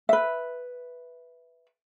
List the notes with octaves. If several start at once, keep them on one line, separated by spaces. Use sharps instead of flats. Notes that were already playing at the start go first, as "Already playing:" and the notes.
B4 E5